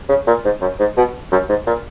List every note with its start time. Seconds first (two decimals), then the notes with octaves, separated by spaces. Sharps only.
0.09 C#3
0.27 A#2
0.44 G#2
0.61 F#2
0.79 G#2
0.97 B2
1.32 F#2
1.49 G#2
1.67 A#2